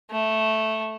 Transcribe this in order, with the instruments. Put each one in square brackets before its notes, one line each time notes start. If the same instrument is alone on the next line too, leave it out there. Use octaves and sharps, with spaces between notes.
[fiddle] A3